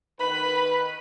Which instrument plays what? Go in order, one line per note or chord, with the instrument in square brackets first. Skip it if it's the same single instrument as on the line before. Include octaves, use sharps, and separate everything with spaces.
[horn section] D#3 B4 [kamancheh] B5